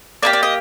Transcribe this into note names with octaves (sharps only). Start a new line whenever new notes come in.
A#3 D#4 G4 D5
D5
D#5